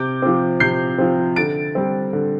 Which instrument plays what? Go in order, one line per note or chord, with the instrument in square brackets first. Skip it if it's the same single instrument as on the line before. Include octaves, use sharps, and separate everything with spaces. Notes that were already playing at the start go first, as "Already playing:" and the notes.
Already playing: [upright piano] C3 D6 G6
F3 C4
C3 G6 C7
F3 C4
D3 A6 D7
G3 C4
D3